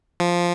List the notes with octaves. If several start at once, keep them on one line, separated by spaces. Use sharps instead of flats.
F3